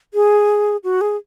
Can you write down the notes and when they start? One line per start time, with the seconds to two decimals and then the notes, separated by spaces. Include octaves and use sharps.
0.14 G#4
0.84 F#4
1.01 G#4